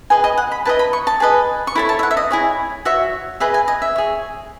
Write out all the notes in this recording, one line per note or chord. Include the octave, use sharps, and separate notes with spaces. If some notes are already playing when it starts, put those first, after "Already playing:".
G#4 B4 D#5 G#5
D#5
F#5
B5
E4 B4 D#5 A5
B5
C#6
A5
G#4 B4 D#5
C#6
E4 A4 C#5 B5
A5
E5
F#5
E5
D#5
E4 G#4 C#5
F#4 C#5 E5
G#4 B4 D#5 E5
G#5
D#5
E5
G#4 C#5